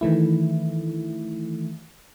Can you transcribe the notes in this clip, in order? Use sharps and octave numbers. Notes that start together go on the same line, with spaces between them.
D#3 E3 A3 E4